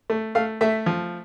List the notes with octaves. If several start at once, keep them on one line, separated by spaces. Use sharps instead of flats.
A3
A3 F5
A3 E5
F3